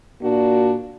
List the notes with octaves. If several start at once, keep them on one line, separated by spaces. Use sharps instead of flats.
A#2 A#3 D4 F#4